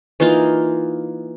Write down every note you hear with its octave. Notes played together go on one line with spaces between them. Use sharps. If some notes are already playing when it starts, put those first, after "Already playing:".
E3 A#3 D#4 F4